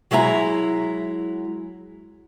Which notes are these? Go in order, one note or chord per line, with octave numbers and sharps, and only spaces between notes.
F#3 G#3 E4 G5 A#5